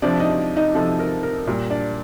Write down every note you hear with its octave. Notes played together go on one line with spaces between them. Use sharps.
C3 F3 D4 D5
D#4 D#5
D#4 D#5
C3 F3 A4
A#4
A#4
A#2 G3 A#4
D4 D5